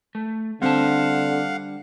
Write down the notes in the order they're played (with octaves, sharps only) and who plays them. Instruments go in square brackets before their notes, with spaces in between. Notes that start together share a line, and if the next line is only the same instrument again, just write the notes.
[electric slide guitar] A3
[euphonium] D3 [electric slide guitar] G3 D4 A5 [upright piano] C4 [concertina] F5 F#5